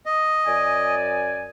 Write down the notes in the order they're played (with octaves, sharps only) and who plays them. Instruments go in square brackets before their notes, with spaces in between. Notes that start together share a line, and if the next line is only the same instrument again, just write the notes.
[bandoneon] D#5
[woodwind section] F#2 D5 G#5